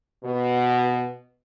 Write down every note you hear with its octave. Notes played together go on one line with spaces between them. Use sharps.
B2